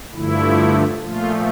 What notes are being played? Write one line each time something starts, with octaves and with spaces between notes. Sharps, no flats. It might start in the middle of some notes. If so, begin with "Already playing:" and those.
G2 D3 F3 A3 E4
A#2 F3 A3 F4